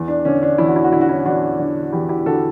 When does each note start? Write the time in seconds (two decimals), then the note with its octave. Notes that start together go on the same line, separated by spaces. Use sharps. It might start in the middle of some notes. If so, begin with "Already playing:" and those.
Already playing: E2
0.08 D4
0.25 D3 C#4
0.43 D4
0.58 E2 E4
0.68 F#4
0.76 E4
0.84 F#4
0.92 D3 E4
1.01 F#4
1.09 C#4 E4
1.25 E2 D4 F#4
1.59 D3
1.93 E2 E4 G4
2.09 E4 G4
2.26 D3 F#4 A4